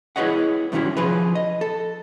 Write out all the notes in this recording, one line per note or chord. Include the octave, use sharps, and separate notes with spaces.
E4 G#4 B4 C#5 D#5 F#5
G2 C3 D#3 F#3 C#4 E4
F3 G#4 B4
D#5
A4